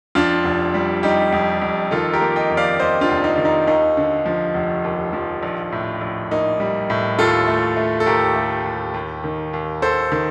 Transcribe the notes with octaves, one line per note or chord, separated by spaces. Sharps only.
F2 D4 F4
F1
G3
G3 D#4 G4
F2
F2
D#3 F4 A4
G4 A#4
A#3
D#5 G5
F2
D5 F5
F2 C5 D#5
D4 F4
F1
D#4
D#3
D#4
D#2 D#4
D3
F3
F1
D#2
F3
A#1
A2
A#1
A#3 D#4
G3
A2
D#2 F4 A4
A3
A3
A4
D#2 G4 A#4
A3
D#2
D#2
D#3
D#2
D#2 A4 C5
D#3